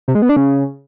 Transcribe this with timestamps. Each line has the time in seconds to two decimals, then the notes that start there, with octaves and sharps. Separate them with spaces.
0.08 C3
0.15 G#3
0.22 B3
0.29 D4
0.36 C#3